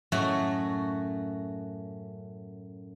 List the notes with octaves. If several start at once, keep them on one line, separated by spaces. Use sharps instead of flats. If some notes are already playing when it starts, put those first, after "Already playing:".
F#2 A2 A3 F#4